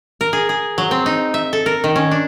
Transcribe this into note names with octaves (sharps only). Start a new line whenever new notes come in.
A#4
G#4
G#4
F#3
C4
D#4
E5
A4
A#4
D#3
C#4
D4